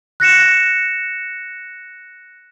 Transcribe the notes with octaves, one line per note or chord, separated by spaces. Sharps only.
F#6 A#6 C#7 E7